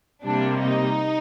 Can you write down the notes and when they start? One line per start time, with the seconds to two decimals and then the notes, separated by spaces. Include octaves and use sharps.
0.24 C3 G3 A#3 D4
0.61 D#4